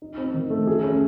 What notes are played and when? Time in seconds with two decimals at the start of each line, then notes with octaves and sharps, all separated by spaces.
0.02 D#4
0.17 C4
0.34 D#3
0.50 A3
0.67 G#4
0.84 C#4